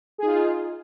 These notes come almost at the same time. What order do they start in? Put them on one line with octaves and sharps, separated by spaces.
G#4 D#4 F4